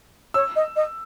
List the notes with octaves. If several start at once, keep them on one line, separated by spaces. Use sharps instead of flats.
C#5 E6
D#5
D#5